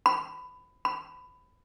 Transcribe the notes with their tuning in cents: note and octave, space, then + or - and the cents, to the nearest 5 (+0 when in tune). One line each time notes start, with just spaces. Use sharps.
B5 +20
B5 +20